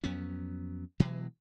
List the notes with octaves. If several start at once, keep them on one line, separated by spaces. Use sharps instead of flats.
F2 F#3 B3 C#4
B2 E3 F#3 G#3